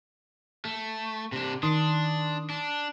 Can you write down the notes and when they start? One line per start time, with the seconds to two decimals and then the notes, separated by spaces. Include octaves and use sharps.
0.65 A3
1.32 C3 D4
1.63 D#3 D4 C6 D#6
2.50 D4